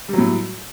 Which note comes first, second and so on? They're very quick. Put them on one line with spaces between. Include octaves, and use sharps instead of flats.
G3 F#3 A2